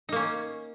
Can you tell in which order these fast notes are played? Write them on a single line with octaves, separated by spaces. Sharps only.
D#4 A#3 C#4